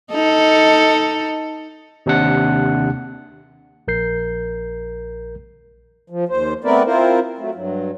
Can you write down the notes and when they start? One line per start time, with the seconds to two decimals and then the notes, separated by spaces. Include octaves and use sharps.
0.12 D#4 A4
2.06 D#2 C3 D4 F#5
3.88 A#1 A#4 G6 C7
6.10 F3
6.29 D#2 C5
6.64 A3 B3 C4 A#4 B4 D5
6.85 C4 E4 F4 A#4 C5
7.38 F#3 A3
7.55 G2 F#3